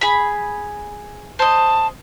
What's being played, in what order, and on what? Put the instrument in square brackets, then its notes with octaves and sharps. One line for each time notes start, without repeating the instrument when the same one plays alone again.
[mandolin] G#4 B5
[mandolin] C5 D#5 [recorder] A5